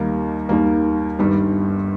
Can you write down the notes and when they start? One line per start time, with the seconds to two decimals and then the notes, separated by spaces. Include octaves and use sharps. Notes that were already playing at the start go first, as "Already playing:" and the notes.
Already playing: D#2 D#3 G3 A#3 D#4
0.49 D#2 D#3 G3 A#3
1.19 G1 G2 D#3 G3